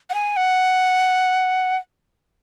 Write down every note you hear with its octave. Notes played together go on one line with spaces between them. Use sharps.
F#5
G#5
F#5